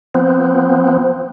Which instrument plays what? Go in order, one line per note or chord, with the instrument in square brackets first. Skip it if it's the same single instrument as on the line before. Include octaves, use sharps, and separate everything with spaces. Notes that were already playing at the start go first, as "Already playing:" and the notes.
[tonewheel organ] F3 B3 C4